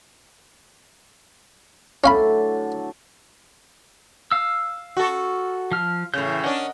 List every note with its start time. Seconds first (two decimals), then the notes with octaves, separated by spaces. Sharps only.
2.04 A2 D3 F#3 C#4 F5 B5
4.31 F5 E6
4.97 F#4 A4
5.72 F3 F6
6.14 A2 C#3 E3 G6
6.44 C#4 D4 A#4 D#5 F#5